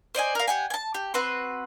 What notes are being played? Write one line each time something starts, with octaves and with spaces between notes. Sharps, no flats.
C5 D5 D#5 G#5
A#4 F5
G4 F#5 G#5
G#5 A5
G4
C4 F#4 B4 C6